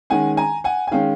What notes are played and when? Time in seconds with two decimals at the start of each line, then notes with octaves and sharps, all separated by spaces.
0.10 D#3 G#3 C#4 F#5 G#5
0.37 G#5 A#5
0.64 F#5 G#5
0.87 G#5
0.91 D#3 G#3 C#4 F5 G5